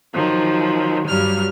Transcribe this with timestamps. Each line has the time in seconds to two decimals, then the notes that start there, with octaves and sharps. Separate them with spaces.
0.14 D#3 F3 F#3
1.07 G2 F#3 G3 F6